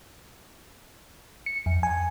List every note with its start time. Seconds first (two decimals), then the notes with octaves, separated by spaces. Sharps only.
1.46 C#7
1.66 F2
1.83 G#5